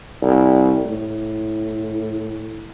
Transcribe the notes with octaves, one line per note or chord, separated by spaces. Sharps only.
C2
A2